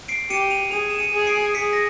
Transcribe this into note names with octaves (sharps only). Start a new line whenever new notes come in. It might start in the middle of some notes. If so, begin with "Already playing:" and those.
C7 D7
G4 C#7 D#7
D#7 F7
G#4 D#7 F7
E7
C#7 D#7
G#4
C7 D7
G#4 B6 C#7
A#6